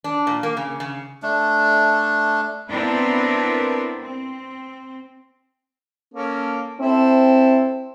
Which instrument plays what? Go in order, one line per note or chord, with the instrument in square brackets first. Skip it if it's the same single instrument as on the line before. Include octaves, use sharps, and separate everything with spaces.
[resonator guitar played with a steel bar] D4
A#2
A#3
C#3
C#3
[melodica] A3 D4
[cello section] B3 C4 D4 E4 A#4 B4
C4
[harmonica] A#3 C#4 A4
[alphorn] C4 [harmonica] E4 A4 C5